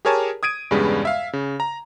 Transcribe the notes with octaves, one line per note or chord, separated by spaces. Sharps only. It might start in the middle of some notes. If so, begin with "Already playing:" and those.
G4 G#4 A#4 C#5 G#5 A5
D#6 G#6 D7 D#7
E2 G2 C#3 G3 G#3 B3
E5 F5
C#3
A#5